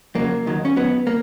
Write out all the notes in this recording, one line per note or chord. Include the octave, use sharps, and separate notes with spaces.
F2 C#3 F#3 A#3
D#2 D#3 F#3
C#4
D#2 D#3 F#3 B3
A#3